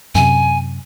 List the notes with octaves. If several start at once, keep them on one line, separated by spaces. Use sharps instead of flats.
F#2 C3 G#5